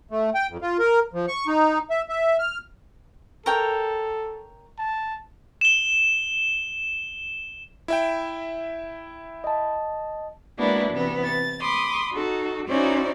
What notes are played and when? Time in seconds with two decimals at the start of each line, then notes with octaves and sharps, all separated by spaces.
0.11 A3
0.35 G5
0.49 F2
0.62 F4
0.79 A#4
1.13 F3
1.28 C#6
1.47 D#4
1.90 E5
2.09 E5
2.39 F6
3.46 A4 A#4 C#5 G5
4.78 A5
5.61 E7 G7
7.88 E4 E5 G5
9.44 D#5 A5
10.58 G#3 A#3 B3 D4 E4 F#4
10.93 C3 E3 B3
11.25 A6
11.61 B5 C6 D6 D#6
12.12 D#4 F#4 A4
12.68 C#4 D#4 E4 F#4 C5 D5